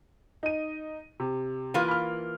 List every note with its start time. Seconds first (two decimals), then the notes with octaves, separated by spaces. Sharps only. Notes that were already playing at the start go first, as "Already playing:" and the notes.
0.43 D#4 D#7
1.20 C3
1.74 E3 A#3 F4 B4
1.89 B5 F6